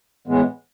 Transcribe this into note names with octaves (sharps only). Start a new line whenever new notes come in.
A2 E3 G#3 B3